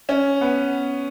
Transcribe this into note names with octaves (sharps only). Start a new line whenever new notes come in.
C#4
B3